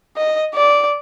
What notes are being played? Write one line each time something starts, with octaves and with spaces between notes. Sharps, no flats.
D#5
D5